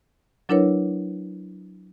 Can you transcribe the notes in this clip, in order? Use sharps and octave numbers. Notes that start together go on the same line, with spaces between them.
F#3 D4 E4 A#4 B4 C#5